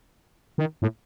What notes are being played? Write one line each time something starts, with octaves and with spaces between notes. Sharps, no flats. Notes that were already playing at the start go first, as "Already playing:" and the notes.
D#3
A2